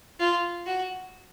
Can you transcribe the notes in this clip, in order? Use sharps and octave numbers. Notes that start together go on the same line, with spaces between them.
F4
F#4